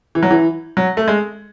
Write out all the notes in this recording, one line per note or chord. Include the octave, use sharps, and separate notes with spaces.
E3
F#3
E3
F#3
A3
G#3